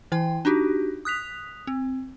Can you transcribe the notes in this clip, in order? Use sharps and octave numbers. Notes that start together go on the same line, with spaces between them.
E3 E4 G5
D4 D#4 F#4 G4
D#6 F#6 B6 F7
C4